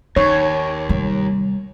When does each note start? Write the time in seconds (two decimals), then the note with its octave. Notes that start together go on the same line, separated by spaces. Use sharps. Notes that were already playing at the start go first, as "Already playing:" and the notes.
0.16 D#2 D#4 C#5
0.89 C3 G3